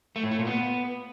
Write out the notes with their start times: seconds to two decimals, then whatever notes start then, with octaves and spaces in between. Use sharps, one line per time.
0.16 A3
0.24 A2
0.31 A3
0.39 A#2
0.47 B3